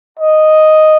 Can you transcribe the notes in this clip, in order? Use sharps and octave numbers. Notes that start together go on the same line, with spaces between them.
D#5